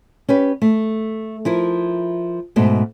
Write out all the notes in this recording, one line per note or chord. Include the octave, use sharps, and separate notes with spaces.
C#4 G4 B4
A3
F3 E4 A#4
G#2 B2 A3